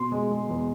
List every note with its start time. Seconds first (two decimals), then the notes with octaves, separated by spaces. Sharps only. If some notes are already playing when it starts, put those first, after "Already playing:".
Already playing: B2 C6
0.12 G#3
0.31 G#3
0.49 E2